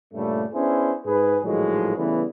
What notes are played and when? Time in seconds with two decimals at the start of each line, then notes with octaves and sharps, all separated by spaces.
0.14 G2 A#2 C#3 G3 A3
0.54 B3 C#4 D4 E4 G#4 C5
1.06 G#2 G#4 B4
1.44 A#1 A2 D#3 F3 F#3 G#3
1.96 C#3 E3 G3 A3 B3